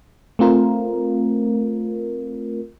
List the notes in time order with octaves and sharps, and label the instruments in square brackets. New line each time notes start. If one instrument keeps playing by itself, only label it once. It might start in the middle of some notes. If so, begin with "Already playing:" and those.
[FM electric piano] A3 C4 F4 A#4